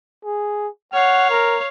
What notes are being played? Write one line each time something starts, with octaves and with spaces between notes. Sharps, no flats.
G#4
C#5 F5 F#5
A#4